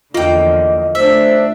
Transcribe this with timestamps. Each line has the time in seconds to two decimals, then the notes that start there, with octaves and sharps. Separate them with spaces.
0.14 E2 D3 F3 A#3 F4 D#5 G5
0.95 A3 D4 C5 E5